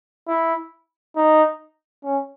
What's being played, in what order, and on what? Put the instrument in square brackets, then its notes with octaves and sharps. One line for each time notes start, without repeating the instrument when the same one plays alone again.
[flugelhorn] E4
D#4
C#4